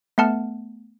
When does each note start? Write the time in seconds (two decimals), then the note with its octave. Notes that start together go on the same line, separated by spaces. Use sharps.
0.18 A3 B3 F#5 A5 F6